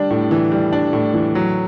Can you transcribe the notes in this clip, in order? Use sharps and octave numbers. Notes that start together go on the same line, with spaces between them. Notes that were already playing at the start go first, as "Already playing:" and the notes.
Already playing: G3 D4
A2
E3
G3
D4
A2
E3
F#3